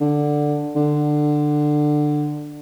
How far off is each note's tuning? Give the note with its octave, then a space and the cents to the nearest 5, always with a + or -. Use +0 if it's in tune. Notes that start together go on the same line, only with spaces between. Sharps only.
D3 +5
D3 +15